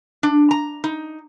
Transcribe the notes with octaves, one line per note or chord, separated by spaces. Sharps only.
D4
A#5
D#4